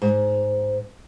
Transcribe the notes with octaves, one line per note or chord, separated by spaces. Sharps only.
G#2